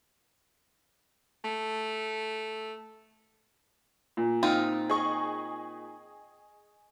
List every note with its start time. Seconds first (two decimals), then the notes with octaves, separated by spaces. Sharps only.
1.44 A3
4.17 A#2
4.43 C4 D#4 F4 D#6 F6
4.90 G#4 D#5 C#6